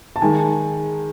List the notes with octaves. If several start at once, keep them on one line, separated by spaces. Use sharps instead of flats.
A5
D#3 G#3 G#5